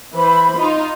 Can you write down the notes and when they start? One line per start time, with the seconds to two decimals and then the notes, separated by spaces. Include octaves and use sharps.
0.14 E3 C5 B5
0.58 D#4 F4